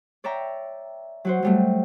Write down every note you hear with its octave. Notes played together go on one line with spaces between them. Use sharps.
C#5 D5 E5 G5 A#5
F#3 F#4 C5
F#3 G3 A3